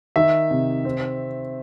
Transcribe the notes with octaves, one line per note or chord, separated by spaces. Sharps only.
D#3 E5
C3
C4